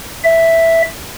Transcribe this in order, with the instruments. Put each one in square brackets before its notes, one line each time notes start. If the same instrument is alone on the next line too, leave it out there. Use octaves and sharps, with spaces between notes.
[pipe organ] E5